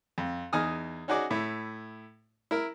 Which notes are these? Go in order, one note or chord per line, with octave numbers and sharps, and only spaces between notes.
F2
E2 D#4 G#5 D#6 F6
C#4 D#4 F#4 G#4 D5
A2 E4
E4 A#4